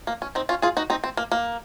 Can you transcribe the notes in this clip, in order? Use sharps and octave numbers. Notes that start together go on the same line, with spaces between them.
A#3
C#4
C4 D#4
C#4 F4
F4 G#4
D#4 F#4
C4 D#4
C4
A#3
A#3